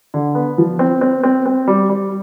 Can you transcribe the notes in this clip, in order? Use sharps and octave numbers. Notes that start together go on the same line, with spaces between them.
D3
B3
F3
C4
C4
C4
C4
G3
G3